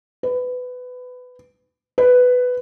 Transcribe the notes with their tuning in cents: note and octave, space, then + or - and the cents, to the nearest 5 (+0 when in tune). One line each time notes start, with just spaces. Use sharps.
B4 +20
B4 +10